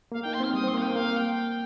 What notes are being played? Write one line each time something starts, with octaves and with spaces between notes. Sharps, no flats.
A#3 F5
D#4 G5
C6
C4 F6
G3 D#6
C4 C6
A#3 F5
G5
A#3 F5
G5